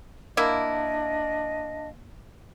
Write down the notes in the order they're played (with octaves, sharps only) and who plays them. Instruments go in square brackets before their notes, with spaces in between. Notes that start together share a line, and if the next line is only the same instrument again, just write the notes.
[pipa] A#3 E4 [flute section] D4 D#5 F5